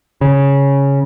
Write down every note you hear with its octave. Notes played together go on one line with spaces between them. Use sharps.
C#3